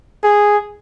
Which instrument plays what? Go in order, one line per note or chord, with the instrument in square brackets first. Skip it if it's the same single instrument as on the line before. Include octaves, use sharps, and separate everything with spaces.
[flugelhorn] G#4